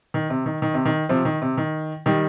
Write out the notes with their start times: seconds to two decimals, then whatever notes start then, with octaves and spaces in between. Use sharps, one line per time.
0.14 D#3
0.30 C3
0.46 D#3
0.62 D#3
0.74 C3
0.85 D#3
1.09 C3 F3
1.25 D#3
1.42 C3
1.57 D#3
2.06 D#3 G3